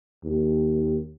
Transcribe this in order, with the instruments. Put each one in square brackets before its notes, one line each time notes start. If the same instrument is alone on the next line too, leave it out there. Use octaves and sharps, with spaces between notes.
[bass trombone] D#2